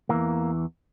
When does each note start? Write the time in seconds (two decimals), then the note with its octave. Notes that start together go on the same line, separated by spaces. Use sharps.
0.09 E2 E3 A#3